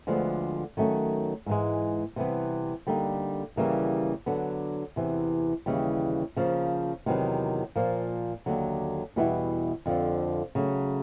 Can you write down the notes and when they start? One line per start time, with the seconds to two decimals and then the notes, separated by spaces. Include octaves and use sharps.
0.07 D2 D3 F3 G#3 B3
0.77 D#3 F#3 A3 C#4
1.46 G#2 E3 G#3
2.16 C3 E3 G3 B3
2.87 D3 G3 A#3 D#4
3.56 D#2 C#3 E3 G3 A#3
4.26 D3 F#3 B3 D4
4.96 E2 C3 E3
5.66 D#2 C#3 E3 G3
6.36 C#3 F3 A#3
7.06 E2 C3 D#3 F#3 B3
7.76 A#2 F3 A#3
8.46 D#2 D3 F#3
9.16 E2 B2 G3 B3 E4
9.86 F2 D3 F3
10.55 C#3 F#3 A3